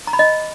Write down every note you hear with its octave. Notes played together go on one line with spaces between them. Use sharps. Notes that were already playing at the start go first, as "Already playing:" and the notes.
A#5
B5
D#5